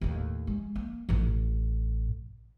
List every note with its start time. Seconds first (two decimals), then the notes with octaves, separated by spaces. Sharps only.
0.01 D#2 A2
0.47 G#3
0.75 A#3
1.09 A1 A2